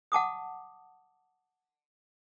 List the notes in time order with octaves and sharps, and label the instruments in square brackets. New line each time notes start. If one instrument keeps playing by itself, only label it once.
[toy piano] F#5 A5 D6 D#6